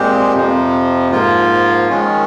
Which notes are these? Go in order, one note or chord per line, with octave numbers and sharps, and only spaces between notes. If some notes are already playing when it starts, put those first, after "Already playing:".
Already playing: A#2 G#3 C4 G4
F2 C3 F3
G#2 F3 A#3 F4
D#3 G#3 C#4